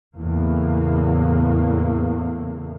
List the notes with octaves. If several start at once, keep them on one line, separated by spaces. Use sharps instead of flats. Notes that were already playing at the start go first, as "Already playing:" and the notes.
E2 A2 C#3 A#3